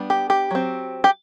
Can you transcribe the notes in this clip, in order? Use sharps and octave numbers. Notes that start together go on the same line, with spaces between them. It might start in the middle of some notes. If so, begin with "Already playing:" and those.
Already playing: G3 B3 D4
G4
G4
F#3 C4
G4